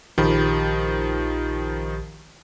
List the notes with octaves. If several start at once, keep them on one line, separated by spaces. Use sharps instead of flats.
A#1 D#3 F3 G4 B5